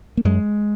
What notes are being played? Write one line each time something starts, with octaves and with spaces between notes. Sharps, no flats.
A#3
F#2 G#3